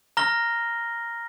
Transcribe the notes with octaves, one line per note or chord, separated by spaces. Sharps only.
A#5 F6 A#6 G7